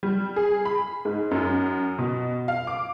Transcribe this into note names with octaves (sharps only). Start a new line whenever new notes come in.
G3
G#4
B5
G#2
F#2
B2
F5
D6